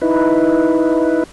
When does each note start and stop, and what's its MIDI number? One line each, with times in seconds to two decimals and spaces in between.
0.02 1.23 63
0.02 1.23 64
0.02 1.23 71